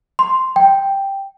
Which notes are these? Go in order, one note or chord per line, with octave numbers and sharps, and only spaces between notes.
C6
G5